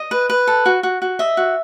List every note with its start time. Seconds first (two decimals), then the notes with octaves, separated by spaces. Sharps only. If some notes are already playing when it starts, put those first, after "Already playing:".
Already playing: D#5
0.11 B4
0.30 B4
0.47 A4
0.66 F#4
0.83 F#4
1.02 F#4
1.19 D#5 E5
1.37 F#4